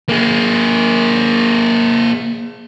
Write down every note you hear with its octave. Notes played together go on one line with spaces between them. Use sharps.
A#3 G#4